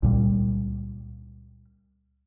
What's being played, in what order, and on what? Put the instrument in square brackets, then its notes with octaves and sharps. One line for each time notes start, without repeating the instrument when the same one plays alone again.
[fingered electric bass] C#2 A#2 G3